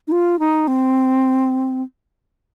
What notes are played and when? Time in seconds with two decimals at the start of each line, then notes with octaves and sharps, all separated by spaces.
0.08 D#4
0.12 F4
0.39 D#4
0.68 C4